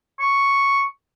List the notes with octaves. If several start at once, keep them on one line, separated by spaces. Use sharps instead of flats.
C#6